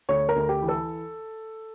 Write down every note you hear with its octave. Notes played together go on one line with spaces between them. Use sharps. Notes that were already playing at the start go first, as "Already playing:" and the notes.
D2 C#5
A#4
D2
G4
E3
A4